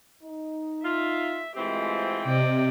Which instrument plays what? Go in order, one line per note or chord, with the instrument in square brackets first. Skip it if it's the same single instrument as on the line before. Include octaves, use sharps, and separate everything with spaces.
[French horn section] D#4
[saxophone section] F4 [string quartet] E5
[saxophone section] E3 C4 [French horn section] G#3 A3 F4 [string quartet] G4
[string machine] C3 [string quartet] D5 D#5 G5